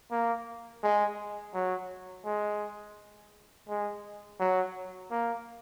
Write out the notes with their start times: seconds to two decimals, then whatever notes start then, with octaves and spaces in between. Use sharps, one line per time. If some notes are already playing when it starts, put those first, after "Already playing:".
0.11 A#3
0.83 G#3
1.54 F#3
2.25 G#3
3.69 G#3
4.40 F#3
5.11 A#3